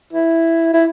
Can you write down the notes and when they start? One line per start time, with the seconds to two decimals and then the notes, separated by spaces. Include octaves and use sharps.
0.13 E4
0.74 E4